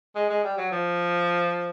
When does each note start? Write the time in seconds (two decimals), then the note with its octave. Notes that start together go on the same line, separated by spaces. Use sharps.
0.15 G#3
0.29 G#3
0.44 G3
0.58 F#3
0.71 F3